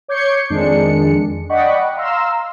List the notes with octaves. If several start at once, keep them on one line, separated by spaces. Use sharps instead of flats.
C#5 D6 G6 G#6 C7 C#7
F2 D#3 G#3 D4 C#7
D5 D#5 F#5 G5 B5 C#6
F5 A#5 C6 E6